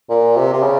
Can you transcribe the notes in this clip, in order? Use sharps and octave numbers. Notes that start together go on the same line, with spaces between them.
A#2
C3
C3
C#3